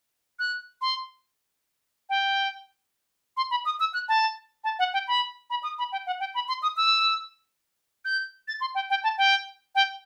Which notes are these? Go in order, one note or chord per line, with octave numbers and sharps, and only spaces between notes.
F#6
C6
G5
C6
B5
D#6
E6
F#6
A5
A5
F#5
G5
B5
B5
D#6
B5
G5
F#5
G5
B5
C6
D#6
E6
G6
A6
C6
G5
G5
A5
G5
G5